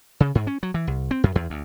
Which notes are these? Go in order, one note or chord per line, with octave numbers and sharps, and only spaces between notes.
C#3
G#2
C#4
F#3
E3
C2
C4
F#2
E2
D2